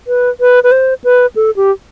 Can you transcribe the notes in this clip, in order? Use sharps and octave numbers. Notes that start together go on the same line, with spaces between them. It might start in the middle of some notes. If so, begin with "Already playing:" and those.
B4
B4
B4
C5
B4
A4
G4